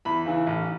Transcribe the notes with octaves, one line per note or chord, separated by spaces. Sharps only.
E2 B5
C#3 E3
A1